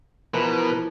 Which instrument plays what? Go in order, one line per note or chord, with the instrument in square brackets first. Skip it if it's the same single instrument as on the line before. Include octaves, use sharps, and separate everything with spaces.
[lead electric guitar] B2 [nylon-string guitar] E3 F3 [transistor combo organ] A#4 B4